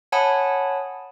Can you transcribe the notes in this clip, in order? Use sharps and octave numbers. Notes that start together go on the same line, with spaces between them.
C#5 F#5 G#5 A5 B5 D#6